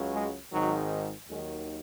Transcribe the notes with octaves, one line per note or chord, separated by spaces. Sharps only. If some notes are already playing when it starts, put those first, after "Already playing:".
Already playing: C#2 C#3 F#3
G#3
G#1 G#2 D#3 F#3
D#2 D#3 F#3 G#3